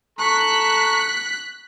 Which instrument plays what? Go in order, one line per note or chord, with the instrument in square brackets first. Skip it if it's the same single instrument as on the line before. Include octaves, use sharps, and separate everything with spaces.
[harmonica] A4 A#5 C#6 [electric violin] F#6 B6